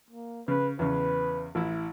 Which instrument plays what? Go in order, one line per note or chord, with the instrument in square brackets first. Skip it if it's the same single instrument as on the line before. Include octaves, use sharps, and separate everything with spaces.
[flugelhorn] A#3
[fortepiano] C#3 [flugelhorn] B4
[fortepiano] E2 C#3 [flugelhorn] B4
[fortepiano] A1 E4